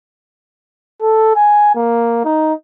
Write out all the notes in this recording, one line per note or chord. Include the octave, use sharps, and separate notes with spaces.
A4
G#5
A#3
D#4